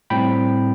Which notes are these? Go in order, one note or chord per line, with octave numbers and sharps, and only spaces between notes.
A2 G3 C4 G5 B5